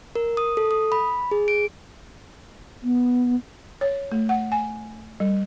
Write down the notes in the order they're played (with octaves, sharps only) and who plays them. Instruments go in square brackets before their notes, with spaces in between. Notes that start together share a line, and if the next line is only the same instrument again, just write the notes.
[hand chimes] A#4
D#6
A4
D#6
B5
G#4
D7
[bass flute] B3
[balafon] C#5
A3
F#5
G#5
G3